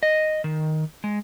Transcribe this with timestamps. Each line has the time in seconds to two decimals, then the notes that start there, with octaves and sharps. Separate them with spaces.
0.03 D#5
0.44 D#3
1.04 G#3